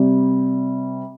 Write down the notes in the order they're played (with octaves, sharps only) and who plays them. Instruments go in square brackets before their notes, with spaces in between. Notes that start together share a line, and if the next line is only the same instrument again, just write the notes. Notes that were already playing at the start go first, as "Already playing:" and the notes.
Already playing: [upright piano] C3 G3